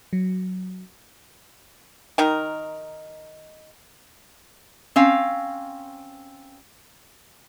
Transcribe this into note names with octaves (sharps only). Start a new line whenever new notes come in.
F#3
D#3 D#4 A#4
C4 C#4 F5